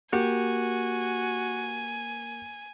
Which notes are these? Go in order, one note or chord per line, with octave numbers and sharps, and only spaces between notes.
A#3 F#4 G4 G#5